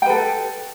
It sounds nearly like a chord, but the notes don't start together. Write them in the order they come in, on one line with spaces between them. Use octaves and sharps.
G5 B4 A4